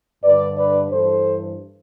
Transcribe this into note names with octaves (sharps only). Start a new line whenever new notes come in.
G2 D3 B4 D5
B4 D5
G2 E3 A4 C5